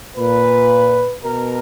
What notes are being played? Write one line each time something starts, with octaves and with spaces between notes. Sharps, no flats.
A#2 B4
B2 A#4